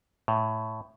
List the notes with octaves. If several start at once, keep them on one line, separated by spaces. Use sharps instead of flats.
A2